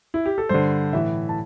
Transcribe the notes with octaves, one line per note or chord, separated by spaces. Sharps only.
E4
G4
A4
G2 D3 C5
A2 E3 E5
A5